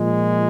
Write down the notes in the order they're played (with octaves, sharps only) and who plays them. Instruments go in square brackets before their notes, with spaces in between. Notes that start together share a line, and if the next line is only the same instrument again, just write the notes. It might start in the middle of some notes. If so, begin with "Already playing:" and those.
Already playing: [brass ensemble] A#2 F3 G#3